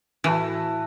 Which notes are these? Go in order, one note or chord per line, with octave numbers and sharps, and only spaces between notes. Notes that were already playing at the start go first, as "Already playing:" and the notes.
A2 E3 E4 F#4 A4